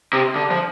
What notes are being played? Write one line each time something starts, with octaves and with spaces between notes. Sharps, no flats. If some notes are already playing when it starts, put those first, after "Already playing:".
C3
D3
F3